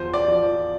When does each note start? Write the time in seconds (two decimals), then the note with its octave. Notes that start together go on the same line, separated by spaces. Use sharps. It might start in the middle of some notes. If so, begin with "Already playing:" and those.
Already playing: E2 F3 C5
0.14 D5
0.28 F3